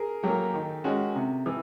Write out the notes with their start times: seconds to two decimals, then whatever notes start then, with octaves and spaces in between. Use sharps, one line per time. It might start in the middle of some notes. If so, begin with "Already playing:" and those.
Already playing: G#4 A#4
0.23 F#3 A#3 G4 A4
0.54 D#3
0.84 G#3 C#4 F#4
1.16 C3
1.46 E3